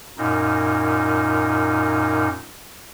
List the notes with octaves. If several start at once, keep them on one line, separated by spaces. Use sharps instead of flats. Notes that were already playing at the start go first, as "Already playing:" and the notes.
F#2 A#2 D#4